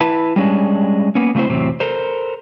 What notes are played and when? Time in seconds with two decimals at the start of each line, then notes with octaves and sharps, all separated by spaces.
0.01 E4 B4 A5
0.36 G3 G#3 C#4 D4
1.15 A#3 B3 C#4
1.35 C#3 A3 C4 E4 C5
1.49 E2 A2 C3 F#3 C4
1.80 A4 A#4 C5